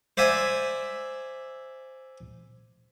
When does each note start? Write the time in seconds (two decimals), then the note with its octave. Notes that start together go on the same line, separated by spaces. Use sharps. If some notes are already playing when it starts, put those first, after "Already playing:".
0.17 C5 D5 E5 G#5